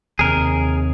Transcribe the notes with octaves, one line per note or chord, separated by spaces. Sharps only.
D#2 C3 G#4 A#4